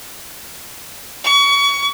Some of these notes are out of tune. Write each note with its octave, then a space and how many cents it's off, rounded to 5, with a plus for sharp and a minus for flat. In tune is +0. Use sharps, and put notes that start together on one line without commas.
C#6 +30